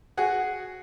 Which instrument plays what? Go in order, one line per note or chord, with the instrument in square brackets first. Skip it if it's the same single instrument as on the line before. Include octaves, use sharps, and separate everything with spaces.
[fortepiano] F#4 G#4 F#5